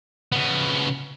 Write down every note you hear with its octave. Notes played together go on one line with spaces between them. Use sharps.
C#3 B3